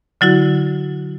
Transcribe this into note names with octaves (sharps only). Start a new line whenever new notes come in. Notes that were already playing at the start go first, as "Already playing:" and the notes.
D3 F#3 E4 F#4